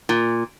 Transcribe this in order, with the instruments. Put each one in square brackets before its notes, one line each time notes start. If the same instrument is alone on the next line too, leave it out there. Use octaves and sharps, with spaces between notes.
[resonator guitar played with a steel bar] A#2